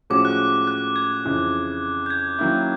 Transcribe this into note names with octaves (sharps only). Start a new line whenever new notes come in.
A2 F3 G#3 C#4 F#4 D6
F#6
F#6
G#6
F2 C#3 E3
G6
G#6
D#3 F#3 A#3 C#4 E4